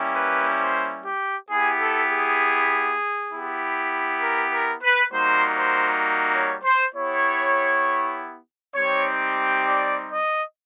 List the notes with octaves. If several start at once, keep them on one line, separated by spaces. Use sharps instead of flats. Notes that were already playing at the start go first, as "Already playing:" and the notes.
Already playing: G3 A#3 C#4 E4 G4
B4
C5
G4
B3 E4 G4 G#4
A4
G#4
B3 E4 G4
A#4
A#4
B4
G3 A#3 D#4 F#4 C5
C5
C#5
C5
B3 E4 G4 C#5
G3 C4 D#4 G4 C#5
D5
D#5